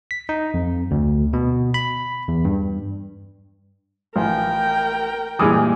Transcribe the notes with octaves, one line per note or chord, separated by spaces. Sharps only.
B6
D#4
F2
D2
B2
B5
E2
G2
A1 F3 A#4 G5 G#5
G2 A#2 E3 G#3 D6 D#6 F6